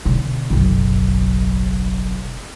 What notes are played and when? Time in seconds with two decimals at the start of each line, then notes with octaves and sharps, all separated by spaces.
0.05 B2 D3
0.50 F#1 B1